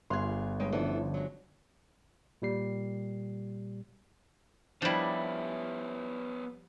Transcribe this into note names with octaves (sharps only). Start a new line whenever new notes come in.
G1 F4 G#4 F5 C6 F#6 G#6
G2 G#3 B4 C#5 G5
D3 E3 F3 B3 C#4 D4 A4
F#3 G#3
A#2 G3 C7
F3 G3 B3 C#4 D4 E4